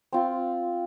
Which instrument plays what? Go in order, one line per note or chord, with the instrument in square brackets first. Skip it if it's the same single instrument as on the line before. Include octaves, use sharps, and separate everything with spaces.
[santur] C4 F4